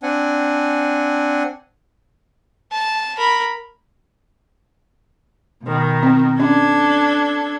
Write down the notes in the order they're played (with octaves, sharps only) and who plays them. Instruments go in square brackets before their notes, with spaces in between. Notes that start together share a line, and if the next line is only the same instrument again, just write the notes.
[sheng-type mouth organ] C4 D4 F#5 G#5
[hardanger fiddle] A5
A#4 B5
[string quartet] B2 D#3
[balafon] C4
[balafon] C#4 [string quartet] D4 A4 G#6